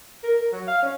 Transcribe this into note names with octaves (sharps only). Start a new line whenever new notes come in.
A#4
A#4
F#3
F5
C#4